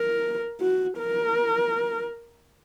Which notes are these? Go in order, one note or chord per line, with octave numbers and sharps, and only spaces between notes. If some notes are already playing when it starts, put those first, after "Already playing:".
Already playing: A#4
F#4
A#4